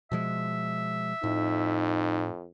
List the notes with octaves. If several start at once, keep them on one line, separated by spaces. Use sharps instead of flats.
B2 F3 G#3 E5
F2 A2 D#4